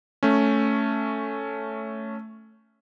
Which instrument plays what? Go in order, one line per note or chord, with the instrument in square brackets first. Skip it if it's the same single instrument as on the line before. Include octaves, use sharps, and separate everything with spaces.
[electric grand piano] A3 C#4